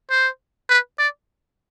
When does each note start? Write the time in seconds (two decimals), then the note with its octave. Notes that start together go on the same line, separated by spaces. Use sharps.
0.10 C5
0.70 B4
0.99 D5